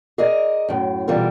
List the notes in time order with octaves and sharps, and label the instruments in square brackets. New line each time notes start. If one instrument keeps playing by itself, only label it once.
[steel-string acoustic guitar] G#4 A#4 D5 D#5
F#2 A2
B2 E3 G3 F4 A4 A#4